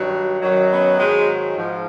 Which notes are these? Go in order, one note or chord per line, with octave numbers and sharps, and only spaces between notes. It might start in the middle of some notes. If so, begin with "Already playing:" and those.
Already playing: G2 D#3 F#3
F#2 D#3 F#3
B3 C#4
G#2 D#3 F#3 G#3
G#2 F3